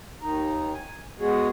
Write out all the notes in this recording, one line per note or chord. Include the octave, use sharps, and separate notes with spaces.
D#2 D#3 D#4 A#5
G#5
G#3 B3 F#4 G#4 C#5